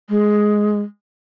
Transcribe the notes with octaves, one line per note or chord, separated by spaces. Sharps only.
G#3